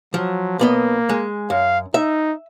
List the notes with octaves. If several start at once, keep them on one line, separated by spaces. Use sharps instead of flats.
F3 F#3
B1 A#3 B3 D#5
G#3
F#2 F5
D#4 E5